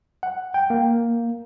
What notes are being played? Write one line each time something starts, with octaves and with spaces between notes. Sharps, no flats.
F#5
G5
A#3